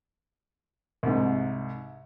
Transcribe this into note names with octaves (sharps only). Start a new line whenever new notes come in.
C2 G#2